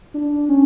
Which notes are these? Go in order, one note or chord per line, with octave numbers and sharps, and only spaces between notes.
D4
C#4